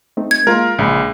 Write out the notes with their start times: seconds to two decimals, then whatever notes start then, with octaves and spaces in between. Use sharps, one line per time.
0.17 A3 C4 D#4
0.31 G#6
0.47 G#3 A#3 F4 A#4
0.79 A#1 C#3 G#3 B5